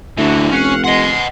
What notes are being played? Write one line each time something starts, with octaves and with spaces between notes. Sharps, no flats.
D2 D3 E3 E4 F#4
F1 C#4 F5 F#5
G#3 D#5 F#5 C6